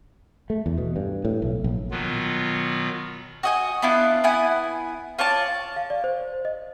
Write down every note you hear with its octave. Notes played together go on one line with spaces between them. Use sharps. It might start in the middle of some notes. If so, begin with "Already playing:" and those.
A3
E2
B2
G2
A2
B1
A#1
B2 D#3 F#3 B3 F4
F#4 D#5 G#5
B3 D4 E4 F4
B3 E4 G#5
F4 C#5 D5 A5
F5
D5
C5
D#5